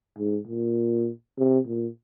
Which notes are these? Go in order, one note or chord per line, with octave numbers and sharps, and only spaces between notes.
G#2
A#2
C3
A#2